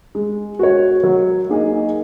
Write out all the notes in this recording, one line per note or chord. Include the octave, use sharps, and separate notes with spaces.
G#3
F#4 C#5
F#3
A#3 D#4 G#4 D#5